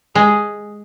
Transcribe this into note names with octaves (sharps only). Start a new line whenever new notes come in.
G#3 G#4